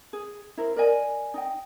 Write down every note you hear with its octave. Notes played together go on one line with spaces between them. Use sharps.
G#4
E4 A#4 C5
A#4 D5 D#5 G#5
D#4 D#5 G5